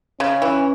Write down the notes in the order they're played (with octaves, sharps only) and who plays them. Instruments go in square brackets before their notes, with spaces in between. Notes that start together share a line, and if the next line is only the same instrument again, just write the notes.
[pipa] C#3 [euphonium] C#4
[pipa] E3